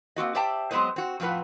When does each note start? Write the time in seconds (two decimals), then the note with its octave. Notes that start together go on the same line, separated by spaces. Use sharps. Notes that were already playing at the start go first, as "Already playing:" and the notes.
0.16 A#3 C4 F#4 D#5
0.35 G4 C5 D5 E5 G5 A5
0.71 F#3 G#3 B3 C4 C5 D#5
0.96 C4 F#4
1.20 F2 A2 F3 C4 B4 F#5